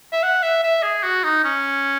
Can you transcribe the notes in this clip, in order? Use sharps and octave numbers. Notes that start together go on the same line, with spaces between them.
E5
F#5
E5
E5
G#4
F#4
D#4
C#4